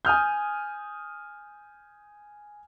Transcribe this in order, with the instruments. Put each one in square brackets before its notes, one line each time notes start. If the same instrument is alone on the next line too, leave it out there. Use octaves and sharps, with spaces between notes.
[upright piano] G#5 D#6 F6 G6